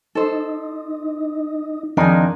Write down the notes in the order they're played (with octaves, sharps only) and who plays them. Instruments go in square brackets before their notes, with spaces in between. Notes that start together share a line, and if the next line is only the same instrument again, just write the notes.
[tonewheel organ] D#4 [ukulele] A4 C5
[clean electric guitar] F2 D#3 D#4 [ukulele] D4 G#4